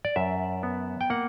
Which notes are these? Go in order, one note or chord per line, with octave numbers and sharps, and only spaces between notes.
D5
F#2 E5
B3
G5
A#3 F#5